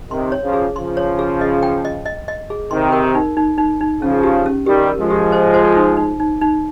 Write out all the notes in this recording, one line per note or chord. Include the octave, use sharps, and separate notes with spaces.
C3 D#3 C6
C#5
C#3 F3
G#4
C#3 F3 C6
C#5
G#4
D#5
G5
D#5
D#5
D#5
G#4
C3 D#3 C6
A#4
D#4
D#4
D#4
D#4
C#3 F3 C#4
G4
C#4
D#3 G3 G4
A#4
F3 G#3
G4
C5
C5
D#4
D#4
D#4
D#4